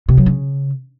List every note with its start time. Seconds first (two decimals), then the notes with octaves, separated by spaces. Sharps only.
0.09 C3
0.17 F#3
0.26 C#3